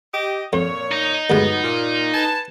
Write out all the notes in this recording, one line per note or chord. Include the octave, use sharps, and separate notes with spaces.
G4 D#5
F2 A#2 C#5
D#4
D2 G2 F#3 G#3 B3
A#2
B4 G#5 A5